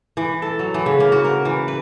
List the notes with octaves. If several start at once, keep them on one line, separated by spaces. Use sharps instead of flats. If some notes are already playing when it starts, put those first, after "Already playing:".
E3
A4
F#3
E3
C#3
A#3
F#4
A#4
E3
B4